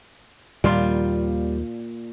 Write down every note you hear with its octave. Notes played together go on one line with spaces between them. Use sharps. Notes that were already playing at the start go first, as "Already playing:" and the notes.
D#2 A#2 D#3 F3 G3 F4